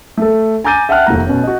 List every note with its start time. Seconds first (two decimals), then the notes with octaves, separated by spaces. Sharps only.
0.17 A3 A4
0.64 G#5 A#5 D6 G6 A6 D#7
0.89 E5 F#5 G5 A5 F6 F#6
1.06 F1 D#2 A3 A#5
1.27 B2 C#4
1.44 F#4 D#5